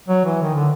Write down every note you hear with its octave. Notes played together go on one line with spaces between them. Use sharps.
F#3
E3
D#3
D3